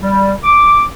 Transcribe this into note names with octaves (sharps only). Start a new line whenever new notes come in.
G3
D6